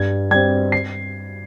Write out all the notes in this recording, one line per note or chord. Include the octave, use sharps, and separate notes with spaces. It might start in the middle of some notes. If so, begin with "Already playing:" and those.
Already playing: G2 G#6
G3 C4 G#6
C7